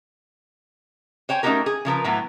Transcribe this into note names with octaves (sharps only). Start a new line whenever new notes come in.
C5 C#5 G5 G#5
A3 C#4 D#4 F#4 G4 A#4
G#4
C#3 F3 A#4 B4
A2 E3 F#3 B3